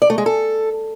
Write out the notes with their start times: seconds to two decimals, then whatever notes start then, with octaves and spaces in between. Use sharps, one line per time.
0.02 D5
0.10 A3
0.18 G#3
0.26 A4